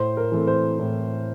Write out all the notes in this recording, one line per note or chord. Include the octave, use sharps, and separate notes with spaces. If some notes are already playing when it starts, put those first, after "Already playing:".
Already playing: A2 C5
A#4
E3 A3 C4
C5
A2